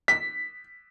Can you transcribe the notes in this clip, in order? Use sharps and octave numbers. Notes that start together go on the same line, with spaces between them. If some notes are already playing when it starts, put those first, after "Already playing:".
B6